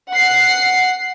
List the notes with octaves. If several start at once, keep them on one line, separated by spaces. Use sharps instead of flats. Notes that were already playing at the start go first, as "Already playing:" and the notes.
F#5 C7